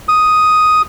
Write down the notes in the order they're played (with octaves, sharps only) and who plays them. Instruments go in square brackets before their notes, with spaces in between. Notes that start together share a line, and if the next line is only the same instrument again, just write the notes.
[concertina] D#6